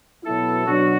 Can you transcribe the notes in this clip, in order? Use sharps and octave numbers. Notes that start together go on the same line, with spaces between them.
B2 F#3 B3 E4 A4
B2 F#3 D4 F#4